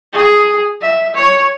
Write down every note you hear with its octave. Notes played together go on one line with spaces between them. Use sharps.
G#4
E5
C#5